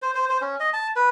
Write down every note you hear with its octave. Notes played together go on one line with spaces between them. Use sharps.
C5
C5
C5
C#4
D#5
A5
B4